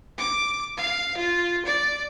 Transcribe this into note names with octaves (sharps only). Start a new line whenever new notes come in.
D6
F5
F4
D5